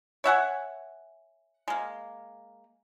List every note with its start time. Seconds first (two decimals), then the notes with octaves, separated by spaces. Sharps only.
0.24 C#5 E5 F#5 G#5
1.68 G#3 A#3